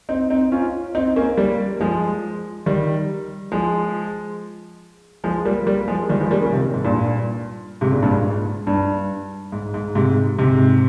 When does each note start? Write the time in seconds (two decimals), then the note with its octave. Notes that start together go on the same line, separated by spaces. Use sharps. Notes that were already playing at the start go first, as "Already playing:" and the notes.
0.09 C4 D#4
0.30 C4 D#4
0.52 C#4 F4
0.95 C4 D#4
1.16 A#3 C#4
1.38 G3 A#3
1.81 F3 G#3
2.66 D#3 G3
3.52 F3 G#3
5.24 F3 G#3
5.45 G3 A#3
5.67 G3 A#3
5.88 F3 G#3
6.09 D#3 G3
6.20 F3 G#3
6.31 G3 A#3
6.42 A#3 C#4
6.52 C3 D#3
6.74 G#2
6.84 G2 A#2
7.81 G#2 C3
7.92 A#2 C#3
8.03 G2 A#2
8.13 G#2
8.67 G2
9.52 G#2
9.74 G#2
9.95 G#2 C3
10.39 G#2 C3